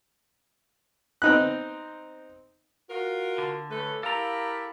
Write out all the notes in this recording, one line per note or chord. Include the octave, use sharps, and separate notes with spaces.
C4 D#4 F#6
F4 F#4 A#4
D3
A3 C#4 A4 B4
E4 G4 A4 A#4 F5 A#5